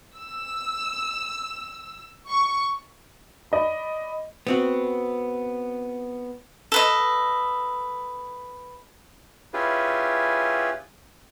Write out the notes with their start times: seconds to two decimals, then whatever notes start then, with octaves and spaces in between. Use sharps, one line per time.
0.19 E6
2.28 C#6
3.52 D5 D#5 B5
4.47 B3 C4 F#4
6.72 A4 B4 D#5
9.54 C#4 E4 F4 G4 G#4 B4